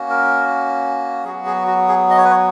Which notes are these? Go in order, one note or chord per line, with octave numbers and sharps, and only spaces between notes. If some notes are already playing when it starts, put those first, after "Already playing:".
Already playing: A#3 C#4 F#4
A#4
F#3 B3 F#4 G#4
G#4
F#4
G#4
D#5
C#5
B4
C#5